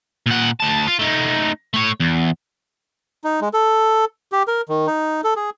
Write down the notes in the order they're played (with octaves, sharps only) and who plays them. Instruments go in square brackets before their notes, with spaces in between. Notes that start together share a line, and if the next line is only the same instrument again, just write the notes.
[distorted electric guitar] A#2 F#5
D2 A5
F4
A3 D#4
A3 C#5
E2
[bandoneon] D#4
G#3
A4
G4
A#4
D#3
D#4
A4
G#4